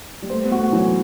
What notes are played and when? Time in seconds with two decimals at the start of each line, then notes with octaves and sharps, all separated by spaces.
0.22 G3
0.30 A3 C5
0.44 B3
0.52 F#4
0.59 A3
0.72 E3 F#3